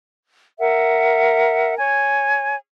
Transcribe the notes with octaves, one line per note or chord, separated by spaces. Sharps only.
A#4 E5 F#5
C#5 G#5